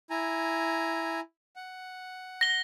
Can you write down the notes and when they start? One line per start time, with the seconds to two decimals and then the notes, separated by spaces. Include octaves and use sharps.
0.10 E4 G#5 A#5
1.56 F#5
2.41 A#6 G7